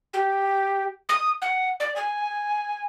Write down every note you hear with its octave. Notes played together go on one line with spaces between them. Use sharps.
G4
D#6
F#5
D5
G#5